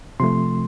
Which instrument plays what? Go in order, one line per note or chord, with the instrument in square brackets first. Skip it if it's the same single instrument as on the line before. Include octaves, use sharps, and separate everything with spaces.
[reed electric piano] C3 F3 A3 C6